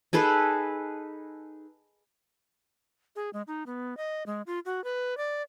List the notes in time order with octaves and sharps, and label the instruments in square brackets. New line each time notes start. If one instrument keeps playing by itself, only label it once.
[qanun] D#4 G#4 A4 B4
[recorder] G#4
G#3
D#4
B3
D#5
G#3
F4
F#4
B4
D5